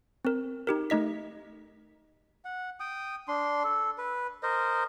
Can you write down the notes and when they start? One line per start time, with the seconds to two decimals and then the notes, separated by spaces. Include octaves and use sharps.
0.25 C4 A#4
0.67 D#4 G4 A#4
0.90 A3 D#4 D#5 B6
2.45 F#5
2.80 G5 D#6
3.28 D4 C6
3.64 A4
3.98 B4
4.43 A#4 C5 D#5